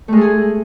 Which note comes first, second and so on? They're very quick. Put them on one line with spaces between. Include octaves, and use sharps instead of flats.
A3 G#3 A4 G#4